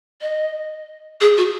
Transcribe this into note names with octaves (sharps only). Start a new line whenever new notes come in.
D#5
G#4
F#4